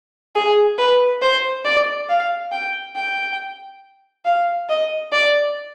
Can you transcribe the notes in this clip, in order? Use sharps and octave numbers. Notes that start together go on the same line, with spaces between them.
G#4
B4
C5
D5
F5
G5
G5
F5
D#5
D5